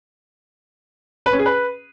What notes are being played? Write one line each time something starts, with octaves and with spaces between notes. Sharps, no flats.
B4
C#4
G#4
B4